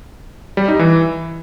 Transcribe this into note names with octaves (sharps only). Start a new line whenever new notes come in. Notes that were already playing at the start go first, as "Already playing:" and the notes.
G3
D#4
E3